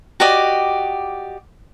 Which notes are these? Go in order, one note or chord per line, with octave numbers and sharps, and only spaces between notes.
F#4 G4 D5 D#5